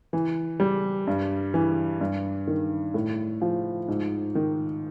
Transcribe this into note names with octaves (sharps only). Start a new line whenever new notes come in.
E3
G3
G2
E3
G2
D#3
A2
F3
G#2
D#3